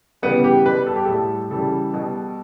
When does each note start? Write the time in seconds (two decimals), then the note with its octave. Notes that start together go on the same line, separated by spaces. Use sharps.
0.22 C#3 E3 G3 B3
0.44 G4
0.66 B2 G3 B4
0.86 A4
0.96 G4
1.05 A2 G3 A4
1.50 C#3 E3 G3 A4
1.93 B2 G3